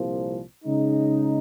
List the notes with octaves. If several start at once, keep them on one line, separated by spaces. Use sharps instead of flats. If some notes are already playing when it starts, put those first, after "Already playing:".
Already playing: C2 A#2 F3
C#3 G#3 D#4